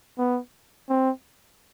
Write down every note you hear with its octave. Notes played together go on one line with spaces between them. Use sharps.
B3
C4